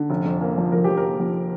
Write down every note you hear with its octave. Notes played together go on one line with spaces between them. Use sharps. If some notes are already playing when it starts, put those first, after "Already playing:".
Already playing: D3
F1
F2
A#3
F3
F1 A#4
F2 G4
A#4
A#3
F3